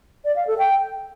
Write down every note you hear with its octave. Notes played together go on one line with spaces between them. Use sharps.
D5
F5
A4
G5